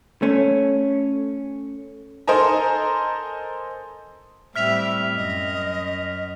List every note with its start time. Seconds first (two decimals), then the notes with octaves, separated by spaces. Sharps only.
0.22 A3 C#4
2.27 A4 A#4 C5 D#5 G#5 A#5
4.56 A2 G3 C4 E5 F6 B6 F7
5.16 F#2 D#5